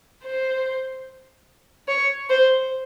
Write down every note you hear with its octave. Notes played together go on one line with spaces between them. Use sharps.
C5
C#5
C5